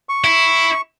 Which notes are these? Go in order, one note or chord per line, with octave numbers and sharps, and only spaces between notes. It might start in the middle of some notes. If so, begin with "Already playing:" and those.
C#6
E4